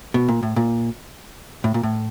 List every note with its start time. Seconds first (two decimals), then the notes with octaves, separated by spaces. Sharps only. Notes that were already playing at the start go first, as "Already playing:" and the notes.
0.14 B2
0.28 A#2
0.43 A2
0.56 A#2
1.64 A2
1.74 A#2
1.83 A2